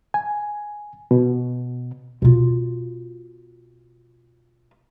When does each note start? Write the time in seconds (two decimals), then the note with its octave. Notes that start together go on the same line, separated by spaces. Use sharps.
0.14 G#5
1.11 B2
2.22 B2 F4